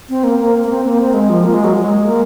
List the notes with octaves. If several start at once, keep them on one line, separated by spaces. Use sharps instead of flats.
C4
A#3
A#3
A#3
C4
A#3
C4
G#3
F3
A#3
G#3
F#3
G#3
A#3